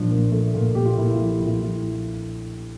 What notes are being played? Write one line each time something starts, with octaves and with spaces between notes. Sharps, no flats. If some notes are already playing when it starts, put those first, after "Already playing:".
Already playing: A#2 F3 D4
A#2
A3
A#2
A#2 G4
F4
A#2 E4
F4
F3
G4
A#2 E4
F4
F3 E4